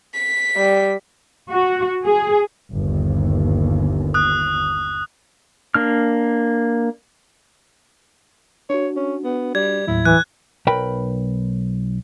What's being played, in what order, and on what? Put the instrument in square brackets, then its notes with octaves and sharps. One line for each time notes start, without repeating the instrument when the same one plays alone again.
[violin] B6
[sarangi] G3
[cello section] F#4
G#4
[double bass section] G1 D#2
[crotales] D#6 F#6
[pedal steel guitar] A#3 D4 F6
[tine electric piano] D4 F#4 [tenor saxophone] C#5
[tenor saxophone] C#4
B3
[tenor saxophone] G3 [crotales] G#6
[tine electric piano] D#2 A2 F#3 [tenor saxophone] E4
[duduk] E3 [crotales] F#6
[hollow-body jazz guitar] B1 A#4 B4 G5 B5